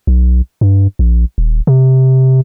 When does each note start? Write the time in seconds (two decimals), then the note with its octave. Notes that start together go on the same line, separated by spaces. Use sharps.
0.07 B1
0.61 G2
0.99 A#1
1.38 D#1
1.67 C3